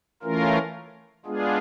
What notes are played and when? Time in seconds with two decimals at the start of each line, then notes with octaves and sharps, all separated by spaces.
0.23 E3 A3 C#4 F4 A#4
1.26 G#3 B3 D4 F4 G#4